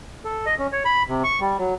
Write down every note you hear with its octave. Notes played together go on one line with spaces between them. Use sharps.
A4
D#5
C#4
C#5
B5
C3
C#6
G3
F#3